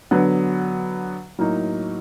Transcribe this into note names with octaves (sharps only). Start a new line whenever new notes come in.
D3 F#3 B3
A2 F#3 A#3 D#4